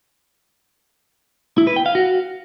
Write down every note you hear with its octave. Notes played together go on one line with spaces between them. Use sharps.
E4
B4
G5
F5
F#4